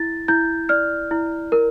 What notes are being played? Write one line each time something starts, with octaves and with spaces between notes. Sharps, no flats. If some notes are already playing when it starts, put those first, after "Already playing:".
Already playing: E4 A6
E4 G6
D5 F6
E4
A#4